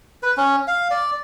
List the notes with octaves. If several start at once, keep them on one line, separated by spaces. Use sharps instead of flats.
B4
C#4
F5
D5